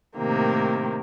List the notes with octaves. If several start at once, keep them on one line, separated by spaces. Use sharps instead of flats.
A2 C3 D#3 A#3